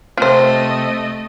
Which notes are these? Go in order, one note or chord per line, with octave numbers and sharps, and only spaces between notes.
C3 A3 C4 F4 C5 D#5